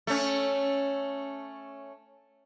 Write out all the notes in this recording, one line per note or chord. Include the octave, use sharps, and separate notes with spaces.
A3 C#4